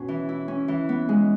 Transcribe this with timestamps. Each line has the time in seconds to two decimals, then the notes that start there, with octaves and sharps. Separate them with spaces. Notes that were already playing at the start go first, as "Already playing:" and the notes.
Already playing: B2 C#4
0.08 E3
0.29 E4
0.48 C#4
0.68 E3
0.89 B3
1.09 G#3